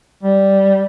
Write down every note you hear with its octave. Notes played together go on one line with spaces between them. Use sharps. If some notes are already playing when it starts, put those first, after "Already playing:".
G3